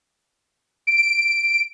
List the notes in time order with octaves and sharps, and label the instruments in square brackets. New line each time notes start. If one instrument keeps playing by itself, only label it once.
[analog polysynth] D7